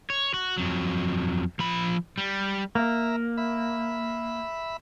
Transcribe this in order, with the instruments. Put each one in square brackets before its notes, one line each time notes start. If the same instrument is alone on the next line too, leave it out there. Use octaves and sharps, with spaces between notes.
[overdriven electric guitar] C#5
F#4
F2 F#3
F3 B5
G3
[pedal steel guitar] A#3 [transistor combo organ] E5 A#5
[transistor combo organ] E5 B5